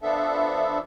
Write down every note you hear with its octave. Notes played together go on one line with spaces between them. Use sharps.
F3 B3 D4 A4 E5